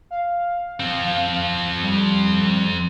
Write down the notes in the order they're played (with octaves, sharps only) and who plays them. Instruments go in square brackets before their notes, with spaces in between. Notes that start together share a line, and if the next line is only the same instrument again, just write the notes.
[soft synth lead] F5
[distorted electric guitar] F3 C4
[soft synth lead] G3